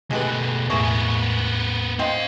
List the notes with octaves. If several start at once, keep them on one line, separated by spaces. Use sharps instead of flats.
B2 G#3 A3 G4 B4
E2 A2 A#3 B3 E4 G#4 C#6
C4 C5 D#5 F5 G5